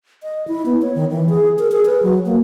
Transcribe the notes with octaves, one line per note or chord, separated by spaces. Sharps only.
D#5
E4
B3
C#5
D#3
E3
G#4
A#4
G#4
B4
F#3
A#3